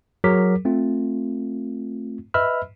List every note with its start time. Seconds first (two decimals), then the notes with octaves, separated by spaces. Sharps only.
0.24 F#3 G#4 A#4 D6 B6
0.65 A3 C4 F4
2.34 B4 D#5 E5 B5 E6 F6